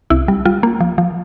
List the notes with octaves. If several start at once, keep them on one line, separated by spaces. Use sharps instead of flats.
C2 E4
G3
G3 F4
A#3
F3
F3